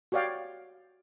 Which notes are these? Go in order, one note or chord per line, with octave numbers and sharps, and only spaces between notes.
F#4 G4 C#5 D5 F5 G5